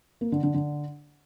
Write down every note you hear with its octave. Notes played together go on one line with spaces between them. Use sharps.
A#3
D3
D3
D3